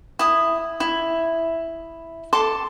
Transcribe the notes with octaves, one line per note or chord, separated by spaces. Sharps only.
E4 D#6
E4
A4 A5 C6 D6